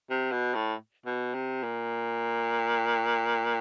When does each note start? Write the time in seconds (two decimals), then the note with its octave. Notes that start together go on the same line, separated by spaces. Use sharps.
0.10 C3
0.32 B2
0.55 A2
1.06 B2
1.34 C3
1.63 A#2